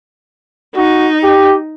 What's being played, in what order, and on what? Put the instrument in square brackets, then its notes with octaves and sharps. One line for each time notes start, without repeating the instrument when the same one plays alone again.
[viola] D#4 [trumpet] F#4
[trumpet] G4